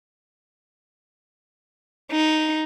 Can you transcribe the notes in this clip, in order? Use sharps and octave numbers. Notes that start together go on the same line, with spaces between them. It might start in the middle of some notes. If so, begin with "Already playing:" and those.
D#4